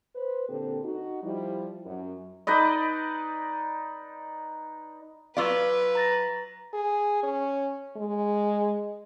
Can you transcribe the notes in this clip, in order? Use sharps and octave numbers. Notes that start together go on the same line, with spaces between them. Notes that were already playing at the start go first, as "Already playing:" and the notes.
B4 C5
A#2 D3 C4 G4 A4
D#4 F#4
F3 G3 E4
F#2
D#4 B4 D5 D#5
F#3 F4 B4 D5 F5 E6
A#5 A6 A#6
G#4
C#4
G#3